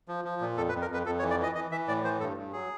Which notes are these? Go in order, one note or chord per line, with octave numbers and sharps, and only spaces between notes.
F3
F3
A#2
F2 A4
B4
F2
A#4
F2 B4
F2 A4
C#5
E3
D5
E3 D#5
E3 D#5
E3 E5
A2 D5
E3 C5
G2 A4
G2
F#3 G#4